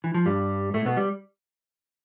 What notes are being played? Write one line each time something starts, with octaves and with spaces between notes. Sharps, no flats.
E3
F3
G2 G3
A2 A3
B2 B3
G3